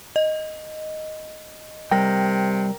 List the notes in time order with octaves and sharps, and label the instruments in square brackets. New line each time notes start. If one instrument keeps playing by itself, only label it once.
[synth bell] D#5
[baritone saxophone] C3 [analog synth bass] G3 [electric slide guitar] A#4 G5